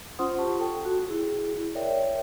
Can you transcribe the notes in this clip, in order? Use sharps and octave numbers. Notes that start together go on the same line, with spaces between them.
C#4 F4 C5 F#5 C6 D#6
F4 G4 A5 C#6
A4 G5
F#4
E4 G#4
A#4 C#5 D5 E5 G5